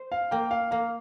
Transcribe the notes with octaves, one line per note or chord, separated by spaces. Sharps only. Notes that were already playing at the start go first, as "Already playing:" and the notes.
Already playing: C5
F5
A#3 G5
F5
A#3 F5